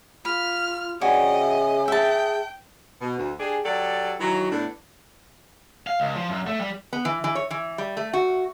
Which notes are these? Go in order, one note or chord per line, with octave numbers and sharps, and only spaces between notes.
F4 B5 F6
C#3 F#4 G4 D5 D#5 G#5
E5
G#4 E5 G5 A5
B2
D2
D4 G4 G#4
F#3 G4 A4 D5
D#3 E3 F#3
A2 B3 D4
F5
C#2
F3
F#2
A3
G3
B3
E3
E3
C#5
E3
G3
A3
F#4